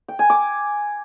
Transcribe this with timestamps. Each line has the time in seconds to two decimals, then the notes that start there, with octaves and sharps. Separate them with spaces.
0.08 G5
0.19 G#5
0.30 D6